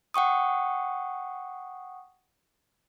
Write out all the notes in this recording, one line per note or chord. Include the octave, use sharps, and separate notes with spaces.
F#5 G5 C#6 D#6